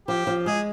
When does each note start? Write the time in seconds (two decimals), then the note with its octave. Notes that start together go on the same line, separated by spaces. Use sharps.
0.08 F3 G4
0.27 F3
0.46 G#3 G#4